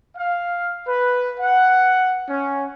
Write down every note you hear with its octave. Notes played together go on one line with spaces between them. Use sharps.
F5
B4
F#5
C#4